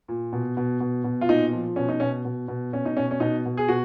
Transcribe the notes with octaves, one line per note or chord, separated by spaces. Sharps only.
A#2
B2
B2
B2
B2
F4
A#2 D#4
F3
B2 C#4
D#4
B2 C#4
B2
B2
B2 C#4
D#4
B2 C#4
C#4
B2 D#4
B2
G#4
B2 F#4